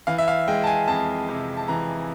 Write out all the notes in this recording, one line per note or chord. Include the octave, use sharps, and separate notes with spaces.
E3 F5
E5
F5
G#3 G5
A5
G#5
F2 A5
C3
A5
E3 A#5